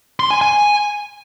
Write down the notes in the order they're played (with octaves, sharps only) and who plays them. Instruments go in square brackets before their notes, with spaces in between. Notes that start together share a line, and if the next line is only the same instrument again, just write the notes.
[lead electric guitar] C6
G#5
G#5